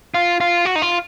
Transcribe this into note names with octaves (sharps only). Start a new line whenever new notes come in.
F4
F4
F#4
D#4
F4